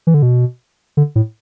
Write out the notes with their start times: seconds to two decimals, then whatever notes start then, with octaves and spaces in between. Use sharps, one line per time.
0.07 E3
0.14 D3
0.22 B2
0.97 D3
1.15 A2